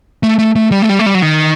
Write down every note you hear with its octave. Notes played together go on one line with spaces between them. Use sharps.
A3
A3
A3
G3
A3
G3
A3
G3
F#3
D#3